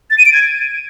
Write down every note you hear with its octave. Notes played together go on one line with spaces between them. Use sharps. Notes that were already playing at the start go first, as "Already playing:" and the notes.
A6
D#7
D7
G#6